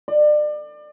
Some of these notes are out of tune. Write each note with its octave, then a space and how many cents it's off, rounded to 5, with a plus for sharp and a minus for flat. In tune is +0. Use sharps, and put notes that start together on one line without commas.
D5 +30